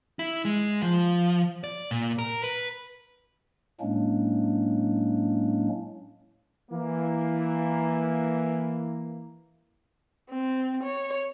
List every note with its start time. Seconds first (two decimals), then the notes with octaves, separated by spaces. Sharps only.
0.19 E4
0.45 G#3
0.82 F3
1.64 D5
1.91 A#2
2.19 A#4
2.44 B4
3.81 A2 F#3 G#3 A#3 C#4 D4
6.71 E3 A#3
10.30 C4
10.83 C#5